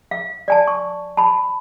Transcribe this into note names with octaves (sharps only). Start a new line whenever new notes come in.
F5
D5 G#5 A5
C#6
A5 B5